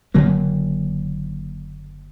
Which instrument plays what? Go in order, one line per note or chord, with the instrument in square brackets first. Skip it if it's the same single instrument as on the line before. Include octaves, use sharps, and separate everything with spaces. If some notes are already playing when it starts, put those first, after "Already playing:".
[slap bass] F#1 D3 F#3 A#3